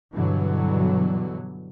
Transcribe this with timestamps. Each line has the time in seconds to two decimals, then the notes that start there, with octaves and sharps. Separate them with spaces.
0.12 G2 B2 D3 E3 F#3